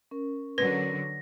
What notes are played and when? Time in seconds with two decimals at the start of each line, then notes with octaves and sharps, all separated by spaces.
0.11 C#4 A#4
0.58 D3 F#3 B4 A#6